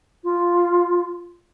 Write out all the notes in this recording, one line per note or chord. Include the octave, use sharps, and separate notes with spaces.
F4